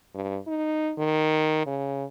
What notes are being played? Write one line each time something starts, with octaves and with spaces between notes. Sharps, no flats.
G2
D#4
D#3
C#3